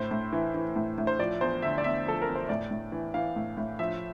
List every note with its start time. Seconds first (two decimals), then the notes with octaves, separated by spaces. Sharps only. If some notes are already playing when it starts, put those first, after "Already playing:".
Already playing: A2 C5
0.11 A2
0.33 E3
0.54 E3
0.76 A2
0.98 A2
1.07 C5
1.19 F3 D5
1.41 E2 C5
1.62 D3 E5
1.78 D5
1.84 E2 E5
2.06 F3 A4
2.22 A#4
2.27 E2
2.36 C5
2.49 A2 D5
2.71 A2
2.92 E3
3.14 E3 F5
3.36 A2
3.57 A2
3.79 F3 E5